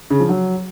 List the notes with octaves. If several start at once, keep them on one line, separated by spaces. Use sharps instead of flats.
C#3
F3
F#3